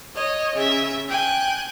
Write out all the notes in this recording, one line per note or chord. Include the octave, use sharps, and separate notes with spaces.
C#5 D#5
C#3 E5
G5 G#5 F#6